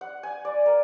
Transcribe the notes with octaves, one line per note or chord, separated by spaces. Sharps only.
F#5
G#5
D5
A#4